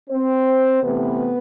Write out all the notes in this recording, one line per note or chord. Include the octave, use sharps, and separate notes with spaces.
C4 C5
C3 E3 A3 B3 B4